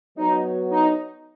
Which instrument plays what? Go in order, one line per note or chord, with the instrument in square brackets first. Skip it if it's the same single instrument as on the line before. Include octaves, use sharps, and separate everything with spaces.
[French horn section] F#3 B3 F#4 C#5 [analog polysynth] D#4
[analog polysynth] D#4